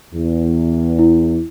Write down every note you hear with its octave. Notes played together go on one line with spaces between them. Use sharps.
E2
E4